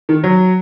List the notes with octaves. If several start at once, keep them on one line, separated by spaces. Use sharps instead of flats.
D#3
F#3